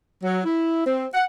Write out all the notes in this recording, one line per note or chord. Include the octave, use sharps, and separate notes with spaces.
F#3
E4
C4
F#5